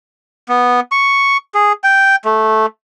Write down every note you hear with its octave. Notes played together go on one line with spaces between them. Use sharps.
B3
C#6
G#4
G5
A3